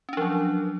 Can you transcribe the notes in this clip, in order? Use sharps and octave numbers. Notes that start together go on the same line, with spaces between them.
F3 F#3 C#4 D4